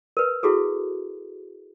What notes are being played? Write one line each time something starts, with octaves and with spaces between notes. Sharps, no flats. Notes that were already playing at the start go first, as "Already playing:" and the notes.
A#4 B4
E4 F#4 G#4 A4